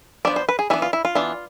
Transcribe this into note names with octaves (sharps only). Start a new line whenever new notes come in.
F3 B3 D4 D5
C5
B4
G#4
E3 B3 D4 E4
F4
E4
F4
E3 B3 D4